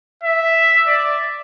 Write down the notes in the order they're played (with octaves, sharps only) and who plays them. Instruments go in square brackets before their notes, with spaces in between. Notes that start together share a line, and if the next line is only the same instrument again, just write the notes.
[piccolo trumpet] E5
D5